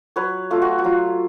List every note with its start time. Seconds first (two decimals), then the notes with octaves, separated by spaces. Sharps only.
0.16 F#3 B4 C#5
0.50 A3 F4
0.62 F#4
0.78 F#4
0.84 F#3 F4